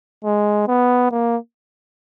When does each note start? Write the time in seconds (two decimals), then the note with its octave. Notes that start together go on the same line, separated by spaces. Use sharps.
0.24 G#3
0.68 B3
1.11 A#3